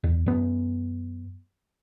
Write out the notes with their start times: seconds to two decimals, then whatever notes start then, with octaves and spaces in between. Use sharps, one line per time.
0.04 E2
0.26 F#2 B3